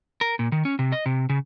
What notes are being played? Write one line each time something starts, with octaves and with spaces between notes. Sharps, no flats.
A#4
A#2
D#3
C#4
C3
D#5
C3
C#3